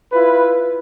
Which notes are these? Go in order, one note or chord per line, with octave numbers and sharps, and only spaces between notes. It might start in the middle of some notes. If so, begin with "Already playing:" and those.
E4 F4 B4